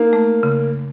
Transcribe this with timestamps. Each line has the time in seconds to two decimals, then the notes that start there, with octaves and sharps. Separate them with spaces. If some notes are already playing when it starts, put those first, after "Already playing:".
Already playing: A#3 D#4
0.13 A3
0.43 C#3